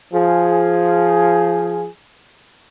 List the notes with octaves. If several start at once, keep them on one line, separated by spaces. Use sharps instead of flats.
F3 G#4